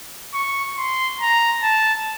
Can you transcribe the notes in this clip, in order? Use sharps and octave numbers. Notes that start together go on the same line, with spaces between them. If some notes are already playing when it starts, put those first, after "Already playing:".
C#6
C6
A#5
A5